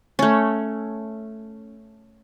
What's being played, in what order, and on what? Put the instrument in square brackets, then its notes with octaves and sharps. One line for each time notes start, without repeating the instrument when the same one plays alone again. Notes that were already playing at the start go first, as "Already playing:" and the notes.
[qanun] A3 C#4